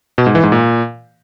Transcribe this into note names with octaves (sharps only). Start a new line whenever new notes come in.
B2
G#2
E3
G#2
A#2